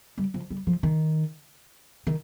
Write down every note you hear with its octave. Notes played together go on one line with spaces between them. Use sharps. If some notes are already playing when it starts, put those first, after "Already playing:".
G3
F3
G3
F3
D#3
D#3